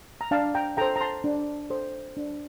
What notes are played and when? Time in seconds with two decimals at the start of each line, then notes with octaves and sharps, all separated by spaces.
0.21 A#5
0.31 D4 F5 A5
0.55 G5 A#5
0.77 A4 C5 G5 A#5
0.96 A#5
1.01 A5 C6
1.24 D4
1.70 A4 C5
2.17 D4